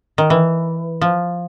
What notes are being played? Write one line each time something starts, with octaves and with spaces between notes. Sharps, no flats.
D#3
E3
F3